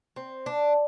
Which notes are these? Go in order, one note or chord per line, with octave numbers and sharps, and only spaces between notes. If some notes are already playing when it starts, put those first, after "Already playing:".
C4
D4